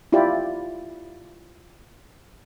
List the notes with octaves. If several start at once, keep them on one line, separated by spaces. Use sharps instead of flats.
E4 F4 G4 D5